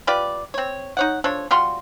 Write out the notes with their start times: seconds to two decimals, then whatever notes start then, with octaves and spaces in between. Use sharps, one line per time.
0.07 F4 G4 B4 D5
0.54 C4 C#5
0.97 D#4 C#5 F#5
1.24 F3 D4 A4 C#5
1.51 G3 F4 F#4 C6